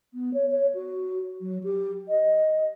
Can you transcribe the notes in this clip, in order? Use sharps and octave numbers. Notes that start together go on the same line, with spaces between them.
B3
C#5
C#5
F#4
F#3
G4
D#5